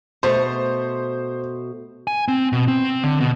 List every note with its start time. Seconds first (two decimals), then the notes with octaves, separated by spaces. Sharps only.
0.23 B2 A3 C5
2.07 G#5
2.28 C4
2.53 B2
2.68 C4
3.04 D3
3.20 B2